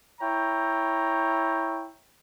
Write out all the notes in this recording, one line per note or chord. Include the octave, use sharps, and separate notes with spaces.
E4 C#5 G5 A#5